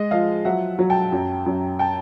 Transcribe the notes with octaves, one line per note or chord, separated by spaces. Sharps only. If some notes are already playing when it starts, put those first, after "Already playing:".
Already playing: G#3 D#5
F3 D#5 F5
F#3 E5 F#5
F#3
G5 A5
F#2
F#2
G5 A5